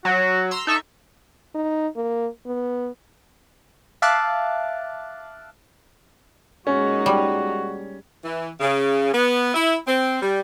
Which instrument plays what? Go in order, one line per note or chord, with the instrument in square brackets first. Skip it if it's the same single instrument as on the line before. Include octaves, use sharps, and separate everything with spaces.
[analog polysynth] F#3 [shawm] F#4
[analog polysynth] A#5 C6 E6
[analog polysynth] D#4 E5 C#6 [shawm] A4
[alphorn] D#4
A#3
B3
[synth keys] E5 F5 A5 D6 F#6
[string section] A#2 G#3 D#4 [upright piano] C#4 [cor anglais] F#4
[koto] G3
[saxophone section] E3
C#3
B3
E4
C4
G3